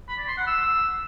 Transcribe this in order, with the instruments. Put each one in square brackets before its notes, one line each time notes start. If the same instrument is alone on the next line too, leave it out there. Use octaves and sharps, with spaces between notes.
[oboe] B5
D5
C6
F#5
E6